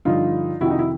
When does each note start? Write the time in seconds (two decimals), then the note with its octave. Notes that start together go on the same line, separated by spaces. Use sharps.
0.05 G2 D3 F3 D#4 F4
0.61 F2 C3 D#3 E4 F#4
0.70 D#4
0.79 E4